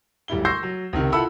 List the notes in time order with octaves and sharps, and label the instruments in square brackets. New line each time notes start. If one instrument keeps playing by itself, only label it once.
[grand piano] D1 G3 E4 G7
C6 C#6 E6 G6 A#6 C7
F#3
C#2 C3 D#3
E4 F4 A4 F#5 B5 E6